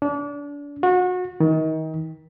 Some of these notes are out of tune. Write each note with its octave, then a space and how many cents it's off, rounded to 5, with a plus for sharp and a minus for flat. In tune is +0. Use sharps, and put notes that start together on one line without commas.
D4 -30
F#4 -30
D#3 +30